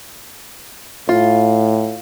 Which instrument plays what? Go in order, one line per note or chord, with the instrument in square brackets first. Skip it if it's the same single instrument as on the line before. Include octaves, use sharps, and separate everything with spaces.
[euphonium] A2 [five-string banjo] F4